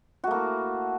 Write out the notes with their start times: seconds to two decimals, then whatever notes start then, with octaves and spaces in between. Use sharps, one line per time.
0.24 F#4
0.27 A3
0.31 A#3
0.34 E4